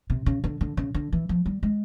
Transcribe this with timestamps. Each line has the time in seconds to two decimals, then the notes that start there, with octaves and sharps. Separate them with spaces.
0.10 C3
0.26 C#3
0.44 D3
0.61 D3
0.77 C#3
0.94 D3
1.12 E3
1.29 F3
1.46 G3
1.63 G#3